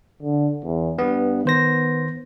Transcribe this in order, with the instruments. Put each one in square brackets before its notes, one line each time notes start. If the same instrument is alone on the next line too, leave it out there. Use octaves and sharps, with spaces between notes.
[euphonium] D3
E2
[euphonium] G2 [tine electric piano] B3
[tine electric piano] D#3 C5 A#6 [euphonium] B3